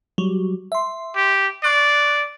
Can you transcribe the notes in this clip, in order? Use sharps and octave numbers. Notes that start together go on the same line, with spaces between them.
F#3 G3
E5 C6
G4
D5 C#6 F#6 C7